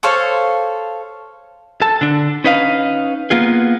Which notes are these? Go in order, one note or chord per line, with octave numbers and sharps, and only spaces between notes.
A4 C5 C#5 F5
A4 A5
D3 D4
C#4 D#4 B4 D#5 F5
A#3 B3 F4 G#4